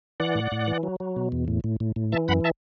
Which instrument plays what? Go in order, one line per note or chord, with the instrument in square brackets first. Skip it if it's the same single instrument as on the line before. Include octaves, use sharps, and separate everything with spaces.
[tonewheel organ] E3 D5 F#5
A2
A2
E3
F#3
F#3
B2
E2
A2
A2
A2
A2
E3 E5 A5
F#2 F#5 B5
E5 A5